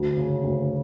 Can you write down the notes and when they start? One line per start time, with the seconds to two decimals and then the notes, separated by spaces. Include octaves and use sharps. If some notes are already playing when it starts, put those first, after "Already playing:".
Already playing: D2
0.17 C#3
0.44 D2